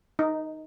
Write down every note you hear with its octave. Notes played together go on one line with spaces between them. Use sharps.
D#4